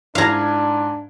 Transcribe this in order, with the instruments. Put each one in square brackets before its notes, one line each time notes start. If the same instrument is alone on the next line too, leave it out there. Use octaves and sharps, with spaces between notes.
[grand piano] G#2 E4 G#6 [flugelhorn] D4 [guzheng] F5 A#5